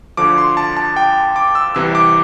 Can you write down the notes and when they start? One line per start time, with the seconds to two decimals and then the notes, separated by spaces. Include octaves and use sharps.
0.17 D2 D3 F3 D6
0.38 C6
0.57 A5
0.77 A5
0.96 G5
1.36 D6
1.55 E6
1.75 C2 C3 E3 E6
1.95 D6